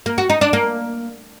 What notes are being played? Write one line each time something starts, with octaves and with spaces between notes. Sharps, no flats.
A#3
F#4
D#4
D4
A#3